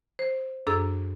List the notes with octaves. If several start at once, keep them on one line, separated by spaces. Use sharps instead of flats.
C5
F#2 D4 G#4 A4 E6